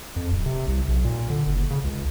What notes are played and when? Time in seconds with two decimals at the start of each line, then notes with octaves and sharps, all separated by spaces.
0.16 F2
0.31 D1
0.46 C3
0.67 C2
0.88 B1
1.04 A#2
1.30 D3
1.46 F#1
1.71 C#3
1.84 C#2